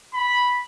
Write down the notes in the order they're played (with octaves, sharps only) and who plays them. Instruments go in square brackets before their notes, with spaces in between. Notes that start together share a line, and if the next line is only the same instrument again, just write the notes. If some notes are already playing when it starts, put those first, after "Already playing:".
[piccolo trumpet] B5